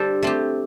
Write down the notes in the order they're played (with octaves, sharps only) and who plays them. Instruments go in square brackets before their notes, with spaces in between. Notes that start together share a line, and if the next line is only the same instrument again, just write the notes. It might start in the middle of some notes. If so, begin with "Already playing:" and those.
Already playing: [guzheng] G3 D4 A4 C5
A3 C4 G4